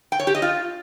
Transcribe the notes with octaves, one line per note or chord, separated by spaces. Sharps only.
G5
C#5
G4
D#5
F4